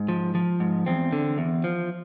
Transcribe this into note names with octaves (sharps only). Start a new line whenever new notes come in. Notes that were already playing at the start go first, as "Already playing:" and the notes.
Already playing: G#2
F3
F3
G#2
E2 C4
D3
E2
F3